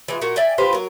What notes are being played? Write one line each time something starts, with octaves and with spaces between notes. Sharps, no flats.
E3 G#3 F4
A#2 F#4 A#4
D5 E5 G5 G#5
F4 G4 B4 C5
F#3 A#4